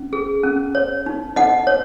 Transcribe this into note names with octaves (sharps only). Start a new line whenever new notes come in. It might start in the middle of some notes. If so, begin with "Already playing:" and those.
Already playing: C#4
G#4
C#4
C#5
D#4
D#4 D#5 F#5
C#5